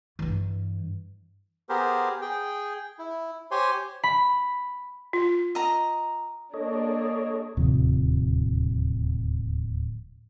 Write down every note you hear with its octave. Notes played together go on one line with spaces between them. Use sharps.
G2 E3
B3 G4 G#4 A#4 C5
G#4 G5
E4
G4 C5 C#5 G#5 C6
B5
F4
D#5 A#5
A#3 D4 G#4 A4 C#5 D#5
D1 D#2 C3 F3